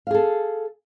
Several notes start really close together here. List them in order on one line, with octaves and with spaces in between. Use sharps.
F5 G#4 A4